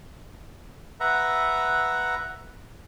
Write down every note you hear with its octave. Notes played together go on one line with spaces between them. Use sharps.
B4 E5 F#5 A#5